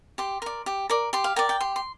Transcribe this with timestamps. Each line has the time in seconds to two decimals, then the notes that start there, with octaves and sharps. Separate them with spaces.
0.18 G4 C6
0.42 A#4 D5
0.66 G4
0.90 A#4 D5
1.13 G4 C6
1.24 F5
1.36 A#4 D5 G5
1.49 G5
1.60 G4 C6
1.76 C6